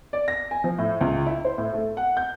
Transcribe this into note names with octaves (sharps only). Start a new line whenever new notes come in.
D5
A#6
G#5
F3
A2
C#2
E4
C5
A2
A3
F#5
G6